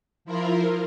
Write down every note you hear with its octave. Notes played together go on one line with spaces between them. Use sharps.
F3 E4 F4 A#4